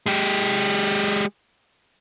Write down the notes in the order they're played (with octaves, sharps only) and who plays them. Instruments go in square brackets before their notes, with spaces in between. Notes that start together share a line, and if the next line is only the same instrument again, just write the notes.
[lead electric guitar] G#3 G4